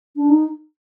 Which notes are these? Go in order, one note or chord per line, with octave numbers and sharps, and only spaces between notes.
D4
D#4